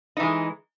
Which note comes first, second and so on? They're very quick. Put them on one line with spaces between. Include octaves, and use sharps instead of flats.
D#4 E3 G#3